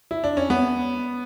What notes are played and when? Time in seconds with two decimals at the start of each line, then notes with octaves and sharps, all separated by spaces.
0.11 E4
0.24 D4
0.37 C#4
0.50 B3